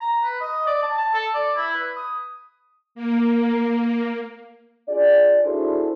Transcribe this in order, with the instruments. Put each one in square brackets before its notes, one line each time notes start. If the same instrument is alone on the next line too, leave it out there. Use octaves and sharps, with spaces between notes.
[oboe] A#5
B4
D#5
D5
A5
A5
A4
D5
E4
B4
D#6
[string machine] A#3
[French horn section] D4 F4 G#4 D5
D4 E4 F#4 G#4 A4 C5